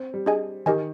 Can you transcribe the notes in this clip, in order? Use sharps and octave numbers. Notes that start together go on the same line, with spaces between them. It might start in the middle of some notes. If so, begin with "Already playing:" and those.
Already playing: C4
G3
D4 G#4 D#5 G#5
D#3 G4 A#4 D#5 G#5